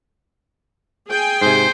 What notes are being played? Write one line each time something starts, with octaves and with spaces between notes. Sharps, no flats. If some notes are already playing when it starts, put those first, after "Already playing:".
G#4 G5 G#5
G#2 C3 C5